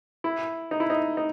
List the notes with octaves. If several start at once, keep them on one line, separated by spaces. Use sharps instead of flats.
E4
D#4
E4
D#4
D#4